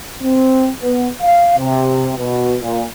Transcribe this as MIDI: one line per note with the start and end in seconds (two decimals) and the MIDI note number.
0.22 0.69 60
0.82 1.07 59
1.22 1.52 77
1.57 2.11 48
2.17 2.56 47
2.61 2.82 46